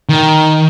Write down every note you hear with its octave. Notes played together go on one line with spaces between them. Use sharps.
D#3